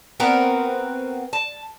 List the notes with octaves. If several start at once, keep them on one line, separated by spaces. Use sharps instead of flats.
B3 C4 F#4 A#4
A5